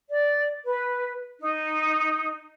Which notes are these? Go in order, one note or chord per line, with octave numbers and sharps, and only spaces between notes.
D5
B4
D#4